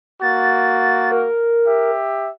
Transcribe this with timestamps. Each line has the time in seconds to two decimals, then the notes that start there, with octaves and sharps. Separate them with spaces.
0.22 A#3 F#4 A6
1.12 A#4
1.67 G4 E5